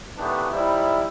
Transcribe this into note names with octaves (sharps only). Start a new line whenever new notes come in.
D#3 E3 A3 B3 D4 G4
F3 G3 D#4 E4